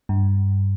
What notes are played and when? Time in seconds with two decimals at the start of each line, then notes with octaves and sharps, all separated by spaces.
0.09 G2